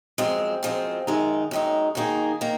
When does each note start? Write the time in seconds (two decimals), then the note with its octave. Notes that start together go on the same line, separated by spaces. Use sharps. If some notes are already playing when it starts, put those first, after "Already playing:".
0.18 F#2 F3 G#3 C4
0.63 F#2 F3 G#3 C4
1.07 F#2 D#3 G#3 D#4
1.51 F#2 D#3 G#3 D#4
1.95 F#2 D#3 A#3 D#4 G#4
2.41 D#3 A#3